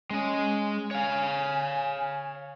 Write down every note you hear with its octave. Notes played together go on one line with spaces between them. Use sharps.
G#3 C#4 D#5
C#5 F5 G#5